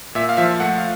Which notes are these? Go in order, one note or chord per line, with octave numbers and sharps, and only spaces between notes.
A#2 E5
F5
F3 E5
A3 F#5
F5